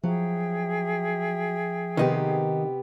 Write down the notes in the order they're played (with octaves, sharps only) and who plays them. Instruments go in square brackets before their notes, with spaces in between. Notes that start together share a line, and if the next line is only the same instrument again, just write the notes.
[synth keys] F3 [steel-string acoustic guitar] F#3 [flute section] G#4 E5 G5
[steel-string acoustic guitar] C3 B3 G4 [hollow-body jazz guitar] D#3 D#4